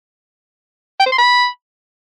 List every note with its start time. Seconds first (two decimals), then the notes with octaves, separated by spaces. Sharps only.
1.00 G5
1.06 C5
1.12 C6
1.18 B5